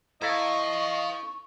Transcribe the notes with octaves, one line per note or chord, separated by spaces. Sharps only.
E4 A4 C5 D#5 F5 A#5 C#6